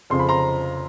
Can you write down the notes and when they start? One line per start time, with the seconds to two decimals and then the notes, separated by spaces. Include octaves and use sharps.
0.10 F2 C#3 F3 C6
0.19 B5
0.29 A#5 C6